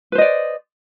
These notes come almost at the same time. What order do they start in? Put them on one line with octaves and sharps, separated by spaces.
B4 C5 D#5 D5